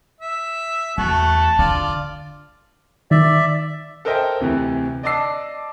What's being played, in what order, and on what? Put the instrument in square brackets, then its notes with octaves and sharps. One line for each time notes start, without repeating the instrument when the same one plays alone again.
[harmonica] E5
[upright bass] E2 [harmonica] A3 F#4 [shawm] A5
[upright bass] D3 [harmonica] F4 D5
[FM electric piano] D#3 [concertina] D5 E5
[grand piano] A4 A#4 C5 D#5 E5 G5
D2 C3 E3
D5 D#5 A5 D6 E6 C7